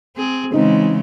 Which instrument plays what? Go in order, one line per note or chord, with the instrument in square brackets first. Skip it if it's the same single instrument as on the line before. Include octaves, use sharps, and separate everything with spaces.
[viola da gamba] C4 G#4
[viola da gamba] C#3 E3 G#3 [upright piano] C4 D#4